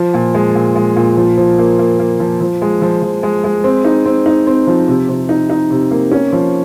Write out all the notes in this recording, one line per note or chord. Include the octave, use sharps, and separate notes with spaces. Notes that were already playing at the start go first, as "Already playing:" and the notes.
Already playing: F3
A#2
G#3
A#2
G#3
A#2
F3
F3
A#3
A#3
A#3
F3
F3
G#3
F3
F3
G#3
G#3
C4
D#4
C4
D#4
C4
F3
C3
C3
D#4
D#4
C3
A#3
C#4
F3